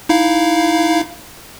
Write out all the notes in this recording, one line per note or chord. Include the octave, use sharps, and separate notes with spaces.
D#4 E4 F5